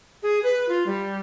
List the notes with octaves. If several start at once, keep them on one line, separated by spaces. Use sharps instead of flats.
G#4
B4
F4
G3